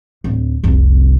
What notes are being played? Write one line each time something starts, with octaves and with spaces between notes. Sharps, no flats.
D1
F1 C2